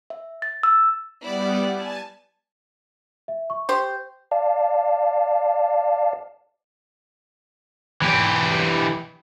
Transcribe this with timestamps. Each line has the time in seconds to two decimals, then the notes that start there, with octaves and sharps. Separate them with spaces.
0.10 E5
0.42 A6
0.63 E6
1.21 G3 B3 E4 D5
1.73 G#5 A5
3.28 E5
3.50 C#6
3.69 G4 C5
4.31 D5 F5 A5
8.02 E3 G4